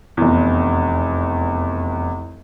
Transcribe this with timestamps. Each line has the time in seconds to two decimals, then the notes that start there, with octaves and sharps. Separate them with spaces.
0.17 F1 E2